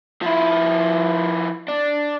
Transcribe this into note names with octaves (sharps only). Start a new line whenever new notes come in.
F3 E4
D4